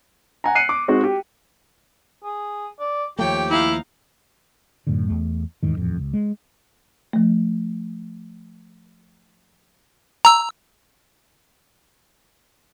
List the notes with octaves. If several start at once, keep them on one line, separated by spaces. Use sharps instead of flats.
F#5 G#5 A#5
F#6 C7 C#7 D#7
D6
G#3 C4 D#4 F#4
G4
G#4
D5
D#2 F3 A3 G4 C#5 G5
D#4 E4 F5
F#2 A2 D3
E2 A3
D1 E2 G#2 D#3
D#1 A1 F2
C#2
G#3
F3 A3
A#5 E6